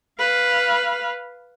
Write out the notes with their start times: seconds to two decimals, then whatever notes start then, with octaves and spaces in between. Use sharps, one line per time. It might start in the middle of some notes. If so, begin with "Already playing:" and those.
0.19 B4 F5